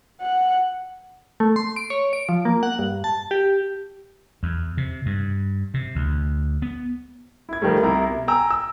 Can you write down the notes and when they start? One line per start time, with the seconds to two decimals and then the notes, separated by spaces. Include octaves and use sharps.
0.21 F#5
1.40 A3
1.56 C6
1.76 D7
1.90 C#5
2.13 D7
2.29 F3
2.45 A#3
2.63 F#5
2.79 G2
3.04 A5
3.31 G4
4.43 E2
4.77 C3
5.06 G2
5.74 C3
5.95 D2
6.62 B3
7.49 E4 G#6
7.62 D#3 F3 G3 A3
7.83 C2 E4 A#5
8.10 B2
8.28 G5 G#5 A#5 E6
8.51 E6